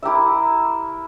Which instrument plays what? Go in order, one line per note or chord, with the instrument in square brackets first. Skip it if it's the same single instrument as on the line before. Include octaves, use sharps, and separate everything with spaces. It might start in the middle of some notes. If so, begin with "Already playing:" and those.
[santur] E4 G4 A#4 E5